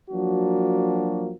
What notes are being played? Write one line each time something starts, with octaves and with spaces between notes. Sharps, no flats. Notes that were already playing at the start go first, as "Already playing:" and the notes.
F3 F#3 A#3 D4 F#4